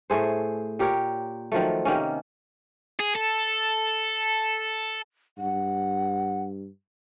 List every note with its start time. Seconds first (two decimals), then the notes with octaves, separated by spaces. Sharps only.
0.10 A2 A3 G#4 C5
0.79 A#2 G4 A#4 C#5
1.52 D#3 F3 F#3 A3
1.85 C3 D#3 A#3 C#4
3.00 G#4
3.15 A4
5.38 G2 F#5